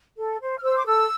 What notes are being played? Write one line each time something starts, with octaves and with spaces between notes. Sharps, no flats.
A4
C5
F6
C5 E6
D6
A4 E6